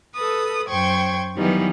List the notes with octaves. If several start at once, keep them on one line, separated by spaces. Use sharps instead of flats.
A4 B4 D#6
F#2 C5 G5 C#6 G#6
D#3 E3 F#3 G3 B3 D#4